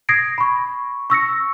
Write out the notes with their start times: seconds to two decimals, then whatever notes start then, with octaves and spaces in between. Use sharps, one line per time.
0.09 D#6 G#6 A#6 C7 D7
0.38 B5 C#6
1.10 C#6 E6 A#6 C#7